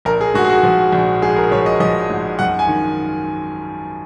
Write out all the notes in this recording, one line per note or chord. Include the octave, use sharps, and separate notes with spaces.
A#1 A#4
G#4
G#2 F#4
G#4
F#4
F3
A#1
G#2 G#4
A#4
F3 C#5
D#5
F3 D#5
G#2
F#2 F#5
G#5
D#3